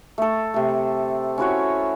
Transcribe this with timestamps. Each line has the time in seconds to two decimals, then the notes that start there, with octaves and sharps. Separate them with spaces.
0.18 A3 A4
0.54 C3 A3
1.38 C#4 E4 F#4 C#5